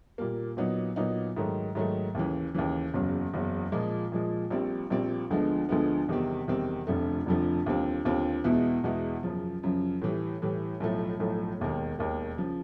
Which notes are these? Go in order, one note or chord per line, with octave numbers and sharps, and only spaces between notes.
A#2 G3 A#3
A#2 F#3 B3 D#4
A#2 F#3 B3 D#4
G#2 D#3 F#3 A3
G#2 D#3 F#3 A3
D#2 C#3 E3
D#2 C#3 E3
F#1 E2 C#3 F#3
F#1 E2 C#3 F#3
A#2 F3 G#3
A#2 F3 G#3
A#1 A#2 G3 C4
A#1 A#2 G3 C4
D2 D3 F3 G#3 B3
D2 D3 F3 G#3 B3
E2 C3 D#3 G3 C4
E2 C3 D#3 G3 C4
F1 F2 D3 F3 A3
F1 F2 D3 F3 A3
D#2 D3 G3 C4 F4
D#2 D3 G3 C4 F4
E2 B2 G#3 B3 E4
E2 B2 G#3 B3 E4
F#2 C#3 F3
F#2 C#3 F3
A2 E3 G3
A2 E3 G3
B1 A2 F3 A3
B1 A2 F3 A3
E1 D#2 D#3
E1 D#2 D#3
C#3 F3